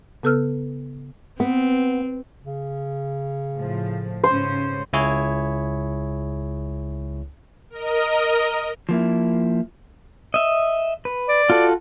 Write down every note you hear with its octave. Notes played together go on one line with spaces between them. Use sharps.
C#3 B3 A4 B4 E6 F6
B3 C4
C#3
A2 F3
G#2 C#3 C#4 C5
C#2 E4 G#4 C#5
A#4 D#5
F3 A#3 E4
D#5 E5
B4
D5
F4 F#4 A4